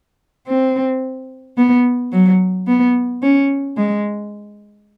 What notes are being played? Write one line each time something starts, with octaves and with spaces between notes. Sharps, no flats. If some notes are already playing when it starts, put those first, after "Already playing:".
C4
B3
F#3
B3
C#4
G#3